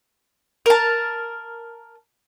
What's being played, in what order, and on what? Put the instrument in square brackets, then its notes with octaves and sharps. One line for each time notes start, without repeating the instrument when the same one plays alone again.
[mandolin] A#4 A5